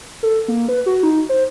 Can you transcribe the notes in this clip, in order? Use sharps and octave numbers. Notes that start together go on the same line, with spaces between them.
A4
A#3
B4
F#4
D#4
C5